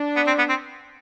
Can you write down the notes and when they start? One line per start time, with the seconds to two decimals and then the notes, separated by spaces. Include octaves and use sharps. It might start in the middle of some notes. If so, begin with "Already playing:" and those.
Already playing: D4
0.16 B3
0.27 C4
0.38 B3
0.49 C4